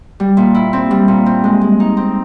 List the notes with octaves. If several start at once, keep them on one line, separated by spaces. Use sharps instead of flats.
G3
A#2
E4
C4
G3
A#2
C4
G#3
G#3
D#4
C4